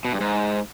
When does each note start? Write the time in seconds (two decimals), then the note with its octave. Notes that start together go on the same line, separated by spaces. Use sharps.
0.05 B2
0.13 G2
0.20 G#2